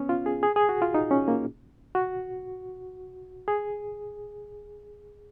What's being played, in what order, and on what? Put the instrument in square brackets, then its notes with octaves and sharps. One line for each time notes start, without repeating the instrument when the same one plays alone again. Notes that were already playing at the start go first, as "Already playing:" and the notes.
Already playing: [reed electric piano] B3 C#4
F4
G#4
G#4
G#4
F#4
F4
D#4
C#4
A#3
F#4
G#4